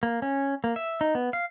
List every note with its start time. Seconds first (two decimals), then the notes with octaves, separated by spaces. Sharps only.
0.03 A#3
0.22 C#4
0.64 A#3
0.76 E5
1.01 D#4
1.15 B3
1.33 F5